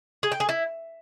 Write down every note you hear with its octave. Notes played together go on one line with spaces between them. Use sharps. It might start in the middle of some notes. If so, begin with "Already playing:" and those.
G#4
G5
G#4
E4